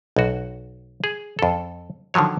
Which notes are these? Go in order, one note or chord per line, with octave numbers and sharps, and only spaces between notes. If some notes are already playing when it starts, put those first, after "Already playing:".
B1 F#4
G#4
F2 A4
D3 D#3 F3 F#3 C#5